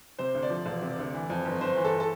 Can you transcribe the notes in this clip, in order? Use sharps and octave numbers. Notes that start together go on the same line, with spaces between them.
C3 C5
D2
D5
F3
E1
C3
D2
E3
F2
G1
G1 C5
E3
A4
A4